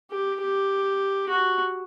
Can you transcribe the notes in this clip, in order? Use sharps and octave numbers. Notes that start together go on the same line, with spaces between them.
G4
G4
F#4